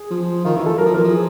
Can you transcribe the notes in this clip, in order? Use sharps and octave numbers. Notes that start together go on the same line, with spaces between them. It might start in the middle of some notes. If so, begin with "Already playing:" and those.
Already playing: G#4
F3
D#3 F4
E3 E4
A4
F#3 A#4
F3
E3 A#4
F3
G#4